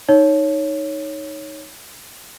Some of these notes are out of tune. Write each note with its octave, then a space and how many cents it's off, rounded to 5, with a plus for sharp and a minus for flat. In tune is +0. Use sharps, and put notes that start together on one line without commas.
D#4 +0 C#5 +0